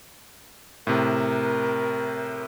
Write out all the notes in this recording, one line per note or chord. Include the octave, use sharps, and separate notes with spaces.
A2 C3 A#4